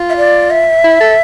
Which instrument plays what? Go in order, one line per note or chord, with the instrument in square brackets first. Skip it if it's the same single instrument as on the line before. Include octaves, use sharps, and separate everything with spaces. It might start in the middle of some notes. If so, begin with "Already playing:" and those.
Already playing: [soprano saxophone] F4
[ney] E5
D5
E5
[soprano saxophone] E4
A4